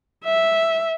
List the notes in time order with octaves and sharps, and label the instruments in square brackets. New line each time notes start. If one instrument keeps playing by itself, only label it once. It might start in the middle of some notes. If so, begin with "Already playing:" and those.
[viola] E5